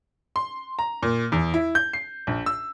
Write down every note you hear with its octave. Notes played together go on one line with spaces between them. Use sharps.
C6
A#5
A#2
E2
E4
G6
C7
A#1
E6